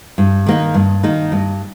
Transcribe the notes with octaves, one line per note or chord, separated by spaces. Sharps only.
G2
D#3 A#3 D#4
G2
D#3 A#3 D#4
G2